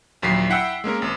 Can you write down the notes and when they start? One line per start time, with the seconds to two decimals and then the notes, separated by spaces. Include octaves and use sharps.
0.22 A#1 D#2 F#3 B6 C7
0.50 E4 F#5 G5 E6
0.84 G#3 A#3 C#4 A#4
1.02 G#1